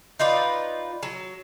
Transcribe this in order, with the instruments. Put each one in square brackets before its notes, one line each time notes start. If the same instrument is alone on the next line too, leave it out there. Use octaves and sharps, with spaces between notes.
[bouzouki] D#4 F4 B4 D5
F#3